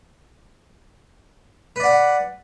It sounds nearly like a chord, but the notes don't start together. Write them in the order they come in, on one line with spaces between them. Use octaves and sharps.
B4 D5 F#5